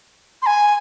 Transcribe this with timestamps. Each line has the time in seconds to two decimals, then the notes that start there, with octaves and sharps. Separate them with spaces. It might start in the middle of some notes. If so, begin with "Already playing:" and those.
0.42 C6
0.46 G#5